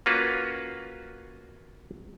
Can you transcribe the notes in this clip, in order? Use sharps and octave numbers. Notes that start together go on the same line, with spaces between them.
A#3 C#4 F4 F#4 B4